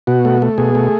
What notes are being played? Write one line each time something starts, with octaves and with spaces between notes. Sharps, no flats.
B2 F#4
A3
A3
B2 G#4
A3